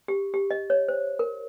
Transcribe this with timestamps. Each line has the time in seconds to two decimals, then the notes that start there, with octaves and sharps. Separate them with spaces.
0.08 G4
0.34 G4
0.51 D#5
0.70 C#5
0.88 C5
1.19 A#4